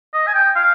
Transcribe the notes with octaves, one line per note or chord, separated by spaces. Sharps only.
D#5
G#5
G5
F5